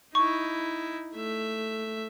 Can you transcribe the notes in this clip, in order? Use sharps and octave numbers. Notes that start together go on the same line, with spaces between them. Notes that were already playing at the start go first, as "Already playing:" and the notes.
D#4 E4 C#6
A3 E5